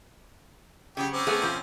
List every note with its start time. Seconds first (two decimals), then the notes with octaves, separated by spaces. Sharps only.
0.97 C#3 F#3 G4
1.13 C4 C#4 D6
1.27 A3 B3 G#4
1.42 B2 F3